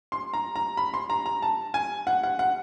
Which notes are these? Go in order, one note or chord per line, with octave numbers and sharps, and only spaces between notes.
C6
A#5
A#5
B5
C6
A#5
A#5
A5
G#5
F#5
F#5
F#5